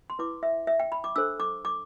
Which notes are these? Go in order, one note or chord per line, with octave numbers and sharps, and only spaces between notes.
C6
E4 B4 D6
E5
E5
G5
B5
D6
D4 A4 C5 E6
D6
D6